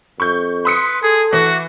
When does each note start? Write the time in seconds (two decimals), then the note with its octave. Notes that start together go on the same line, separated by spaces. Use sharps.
0.20 F2 C#6 G6
0.65 B4 C6 D#6 C#7
1.02 G#4 A4
1.33 E3 F#4